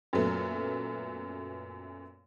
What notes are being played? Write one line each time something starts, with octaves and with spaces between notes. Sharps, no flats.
F#2 A#2 F#3 A3 B3